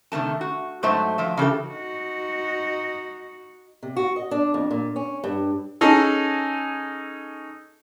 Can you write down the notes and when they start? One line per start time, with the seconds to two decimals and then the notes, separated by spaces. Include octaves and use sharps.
0.12 C3 D#3 A3 A5
0.41 F#4
0.83 G#2 F#3 A3 C5 E5 A5
1.18 F3 F#3 E5
1.37 C#3 E3 G4 A4
1.68 D#4 F#4
3.83 C3
3.96 F#4
4.16 D#5
4.31 D4
4.54 F2
4.71 A#2
4.96 C#4
5.24 G2
5.81 C#4 D#4 G#4 A4